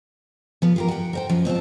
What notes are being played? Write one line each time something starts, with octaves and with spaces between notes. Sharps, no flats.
F3 B3
F4 G4 A#4
F#5 G5
A#4 C5 G5
F#2 F3
B2 C4 F4 A5